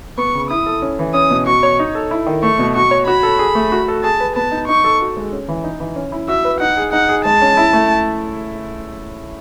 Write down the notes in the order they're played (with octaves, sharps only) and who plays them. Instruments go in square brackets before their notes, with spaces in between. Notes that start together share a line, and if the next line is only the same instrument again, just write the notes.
[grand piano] B3 [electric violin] C#6
[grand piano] C#3
[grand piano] E4 [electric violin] D#6
[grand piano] A4
C#4
E3
[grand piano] C#4 [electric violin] D#6
[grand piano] B2
[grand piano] F#4 [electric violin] C#6
[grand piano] C#5
D#4
A4
E4
D#3
[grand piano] A3 [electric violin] C#6
[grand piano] B2
[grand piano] F#4 [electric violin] C#6
[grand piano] C#5
[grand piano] F#4 [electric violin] B5
[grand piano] A4
G#4
A3
F#4
A4
[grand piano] G#4 [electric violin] A5
[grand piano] B4
[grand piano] B3 [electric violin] A5
[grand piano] D#4
[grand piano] D#4 [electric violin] C#6
[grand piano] A4
F#4
G#3
C#4
E3
D#4
E3
C#4
E4
[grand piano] F#4 [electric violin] E5
[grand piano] B4
[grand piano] D#4 [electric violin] F#5
[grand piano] G#4
[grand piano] D#4 [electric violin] F#5
[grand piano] G#4
[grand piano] G#3 [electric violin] A5
[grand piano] C#4
E4
A3